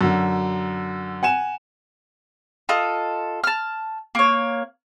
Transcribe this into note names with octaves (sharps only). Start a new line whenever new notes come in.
F#2 D3
F#5 G#5 E7
F4 A4 D#5
A5 F6
A#3 C#5